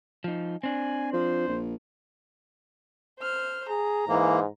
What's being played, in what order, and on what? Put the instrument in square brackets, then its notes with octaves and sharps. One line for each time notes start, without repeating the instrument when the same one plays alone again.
[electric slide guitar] F3 D#4
[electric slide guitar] C4 D4 [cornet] G#5
[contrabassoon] F3 [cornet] C5
[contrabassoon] A#1
[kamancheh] C5 F6
[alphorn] G#4 [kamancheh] A#5
[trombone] G#2 [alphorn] E3 [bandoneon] A#3